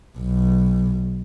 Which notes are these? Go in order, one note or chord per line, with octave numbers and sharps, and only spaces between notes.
B1